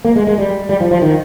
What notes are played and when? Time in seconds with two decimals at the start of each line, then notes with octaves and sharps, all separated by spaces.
0.05 A#3
0.16 G#3
0.27 G#3
0.38 G3
0.69 G3
0.80 F3
0.91 F3
1.02 D#3